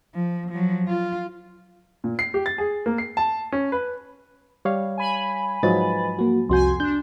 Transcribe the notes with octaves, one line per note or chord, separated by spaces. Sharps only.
F3
F3 F#3
F4
A#2
C7
G4
A6
G#4
A#3
C7
A5
C#4
B4
G3 C#5 F5
G#5 B5
G#2 F3 F#3 B4 D#5 A6
A#3 F#4
C2 F2 F#4 G#5 C6 G6
D4 G6